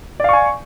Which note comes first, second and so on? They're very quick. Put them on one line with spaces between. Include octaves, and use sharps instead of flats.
D5 F5 C#6 G#5